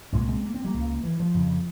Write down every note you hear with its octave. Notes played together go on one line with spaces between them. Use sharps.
C2 A#2 G#3 C4
G#3 C4
A#3
C4
G3 A#3
C#2 C#3
E3
F3
F2 C#3